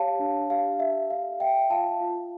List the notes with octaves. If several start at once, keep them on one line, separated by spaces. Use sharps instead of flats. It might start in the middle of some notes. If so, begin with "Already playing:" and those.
Already playing: G4 C#5 F5 A5
D4
G4 F5
G4 E5
A4 F5
D5 E5 G5
F4 F5 A5
F4